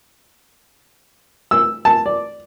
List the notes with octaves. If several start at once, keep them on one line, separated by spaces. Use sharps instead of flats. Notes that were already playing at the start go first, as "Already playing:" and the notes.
E6
A5
D5